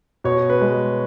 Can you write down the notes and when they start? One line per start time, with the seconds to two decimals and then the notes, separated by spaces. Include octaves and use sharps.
0.24 B2 C#5
0.50 B4
0.61 G#3